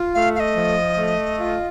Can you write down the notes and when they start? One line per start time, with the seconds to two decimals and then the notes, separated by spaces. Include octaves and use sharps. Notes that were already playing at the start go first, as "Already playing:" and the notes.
Already playing: F4
0.14 A3 F5
0.35 F5
0.40 D#5
0.56 F3
0.98 A3
1.40 F4